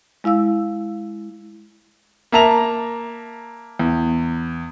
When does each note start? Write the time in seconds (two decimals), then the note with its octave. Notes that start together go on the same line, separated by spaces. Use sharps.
0.24 G#3 E4 F5 E6
2.32 A#3 E5 A5 A#5 F7
3.79 E2